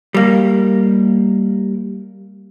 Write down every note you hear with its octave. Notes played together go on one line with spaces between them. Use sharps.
G3 A#3